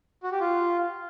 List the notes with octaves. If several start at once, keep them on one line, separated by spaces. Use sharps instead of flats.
F#4
G4
F4